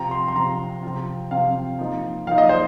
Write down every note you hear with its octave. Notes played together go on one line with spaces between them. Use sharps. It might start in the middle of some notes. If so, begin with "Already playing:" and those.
Already playing: C3 F3 C4 A#5
C6
C6
C3 F3 C4 A#5
C3 F3 C4 F4
C3 F3 C4 F4 F5
F3 A#3 D#4
F3 A#3 D#4 F5
D#5
C5